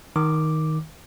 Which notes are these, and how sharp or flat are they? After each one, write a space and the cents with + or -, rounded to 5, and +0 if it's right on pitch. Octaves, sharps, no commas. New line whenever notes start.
D#3 +10 D6 +0